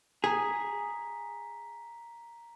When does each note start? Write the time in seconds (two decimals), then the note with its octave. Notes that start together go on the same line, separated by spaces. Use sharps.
0.24 G#4 A#5 B6